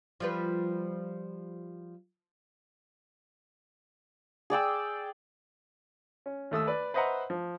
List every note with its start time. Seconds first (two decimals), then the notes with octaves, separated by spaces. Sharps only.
0.20 F3 G3 B4
4.50 G#4 D5 G5 E6
6.26 C#4
6.51 D#2 A3 D#6 E6
6.67 B4 D5
6.94 B4 C5 D#5 E5 F#5 A#5
7.30 F3